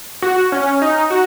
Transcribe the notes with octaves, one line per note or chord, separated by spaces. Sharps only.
F#4
C#4
D#4
F#4